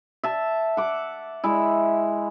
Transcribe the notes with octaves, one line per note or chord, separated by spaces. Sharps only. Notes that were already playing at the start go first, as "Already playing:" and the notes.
E5 A5
F#5 D6
G#3 E4